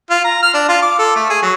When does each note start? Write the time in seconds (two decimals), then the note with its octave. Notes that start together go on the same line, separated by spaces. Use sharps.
0.10 F4
0.24 A#5
0.43 F6
0.54 D4
0.69 F4
0.82 D6
0.99 A4
1.16 A3
1.30 G#4
1.43 F#3